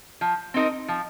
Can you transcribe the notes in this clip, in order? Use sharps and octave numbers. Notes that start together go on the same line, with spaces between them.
F3
C4 D#4 A#4
F3